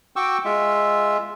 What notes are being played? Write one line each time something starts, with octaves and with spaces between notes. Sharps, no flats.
F#4 G5 C#6 D6 E6
G#3 F4 E5